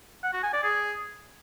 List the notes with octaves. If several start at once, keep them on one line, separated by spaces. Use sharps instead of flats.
F#5
F#4
G#5
D5
G#4